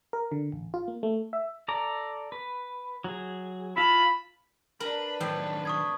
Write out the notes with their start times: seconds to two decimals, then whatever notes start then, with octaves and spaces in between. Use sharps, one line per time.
0.13 A#4
0.32 D3
0.52 A1
0.74 F4
0.88 A#3
1.03 A3
1.33 E5
1.68 A4 D5 A#5
2.32 B4
3.04 F#3 G#4
3.77 E4 F4 A5 B5
4.80 D4 A#4 B4 B5
5.21 A2 D#3 F#3 C4 G5
5.65 C#6 D#6 G#6